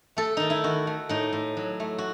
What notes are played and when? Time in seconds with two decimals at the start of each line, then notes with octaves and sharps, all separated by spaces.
0.17 A3 A4
0.37 D#3 D#4
0.50 E4
0.64 D#3 F#4
0.87 A3
1.09 A2 D#4
1.33 A2
1.57 F#3
1.80 A3
1.98 F#4